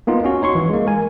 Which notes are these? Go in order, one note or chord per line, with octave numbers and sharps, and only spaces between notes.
A#3 B3 D#4 F4
C#4 F#4
D#4 C#5 C6 C#6
E3
G#3 A#3
A#4 G#5